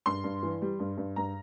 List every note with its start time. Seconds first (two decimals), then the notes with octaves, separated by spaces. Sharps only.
0.06 G2 C6
0.24 G2
0.43 E3
0.62 G3
0.79 G2
0.97 G2
1.16 G2 A#5